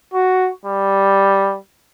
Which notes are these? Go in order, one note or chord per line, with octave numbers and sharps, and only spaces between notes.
F#4
G3